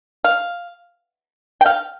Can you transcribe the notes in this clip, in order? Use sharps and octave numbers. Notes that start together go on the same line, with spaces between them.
F5
G5
F5